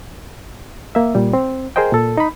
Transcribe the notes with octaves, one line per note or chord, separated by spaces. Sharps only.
A#3 E5
A#2 G3
C4
G#4 A#4 C5 D#5 G5
A#2 A4
D#4 B5